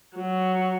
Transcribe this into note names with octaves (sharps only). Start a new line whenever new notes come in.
F#3